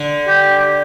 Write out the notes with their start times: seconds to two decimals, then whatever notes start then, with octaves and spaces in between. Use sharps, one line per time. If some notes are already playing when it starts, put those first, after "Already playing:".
Already playing: D3
0.28 G4